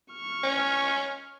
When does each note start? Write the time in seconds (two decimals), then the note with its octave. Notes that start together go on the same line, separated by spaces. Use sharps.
0.13 C#6 F6
0.43 C#4